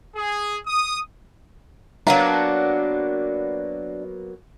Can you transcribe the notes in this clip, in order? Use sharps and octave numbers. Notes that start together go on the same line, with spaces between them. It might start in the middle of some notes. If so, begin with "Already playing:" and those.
G#4
D#6
F#3 A#3 B3 D4 F5 A#5